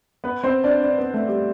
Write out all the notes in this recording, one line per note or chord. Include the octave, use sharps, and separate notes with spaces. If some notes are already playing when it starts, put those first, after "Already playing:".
B3 B4
C4 C5
D4 D5
D4 D5
B3 B4
A3 A4
G3 G4